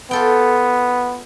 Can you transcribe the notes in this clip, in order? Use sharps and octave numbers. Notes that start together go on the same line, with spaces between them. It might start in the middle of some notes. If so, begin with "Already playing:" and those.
B3 F4 A4 G5